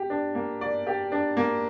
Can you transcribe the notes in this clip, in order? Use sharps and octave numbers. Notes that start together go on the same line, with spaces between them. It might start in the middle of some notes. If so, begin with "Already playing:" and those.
Already playing: G4
D4
A#3
D5
G4
D4
A#3